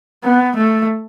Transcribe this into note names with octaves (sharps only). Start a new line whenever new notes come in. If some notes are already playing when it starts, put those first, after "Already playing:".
B3
A3